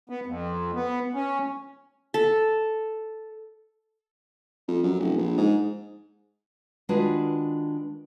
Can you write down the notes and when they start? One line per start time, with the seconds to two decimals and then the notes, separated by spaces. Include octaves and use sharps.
0.10 B3
0.26 F2
0.75 B3
1.14 C#4
2.14 A4
4.68 F2
4.83 F#2
5.00 F1
5.17 A#1
5.38 G#2
6.89 D#3 G#3 D4 F4 F#4 B4